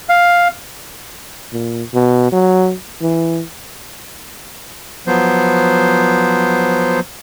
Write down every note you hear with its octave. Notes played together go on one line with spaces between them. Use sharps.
F5
A#2
B2
F#3
E3
F3 F#3 B3 C5